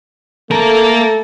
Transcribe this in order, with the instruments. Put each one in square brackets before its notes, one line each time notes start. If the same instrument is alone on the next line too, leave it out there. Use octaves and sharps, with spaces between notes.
[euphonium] A3 [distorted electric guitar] A#3 A#4 [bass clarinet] A4